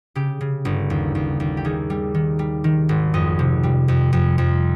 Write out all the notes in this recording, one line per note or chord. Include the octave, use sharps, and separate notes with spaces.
C#3 G4
C#3
G1
D#2
D#2
D#2
G4
D#3 G#4
G3
D#3
G3
D#3
G#1
F2 D#5
C3
G3
F2
F2
F2